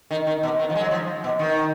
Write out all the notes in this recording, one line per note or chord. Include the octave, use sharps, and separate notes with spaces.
D#3
D#3
B2
D#3
F3
G#3
F#3
F3
B2
D#3